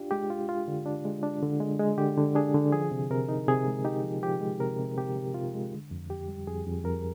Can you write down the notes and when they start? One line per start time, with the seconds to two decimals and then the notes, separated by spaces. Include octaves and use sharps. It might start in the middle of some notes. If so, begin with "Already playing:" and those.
Already playing: D4 F4 G4
0.11 G#3 G4
0.30 F4
0.49 F4
0.68 D3
0.86 D4
1.05 G#3
1.23 D4
1.43 D3
1.60 G#3
1.79 G#3
1.98 D3 G4
2.17 D3
2.35 D4 G#4
2.54 D3
2.72 F3 G#4
2.91 C3
3.10 C3 A#4
3.29 D#4
3.48 C3 G#4
3.67 G#3
3.85 D#4 G4
4.04 F3
4.23 F3 G4
4.41 G#3
4.60 C3 A#4
4.79 C3
4.97 C3 G4
5.16 C3
5.34 C3 F4
5.54 G#3
5.73 D3
5.91 F2
6.10 F2 G4
6.28 G3
6.47 F2 G#4
6.67 F2
6.84 F2 A#4